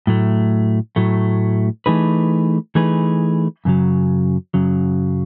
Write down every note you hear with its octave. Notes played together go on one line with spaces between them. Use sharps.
A2 F#3 A3
A2 F#3 A3
E3 A3 D#4 G#4 B4
E3 A3 D#4 G#4 B4
F#2 C#3 F#3
F#2 C#3 F#3